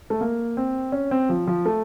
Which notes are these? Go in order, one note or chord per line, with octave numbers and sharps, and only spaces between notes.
A3
A#3
C4
C#4
C4
F3
F3
A3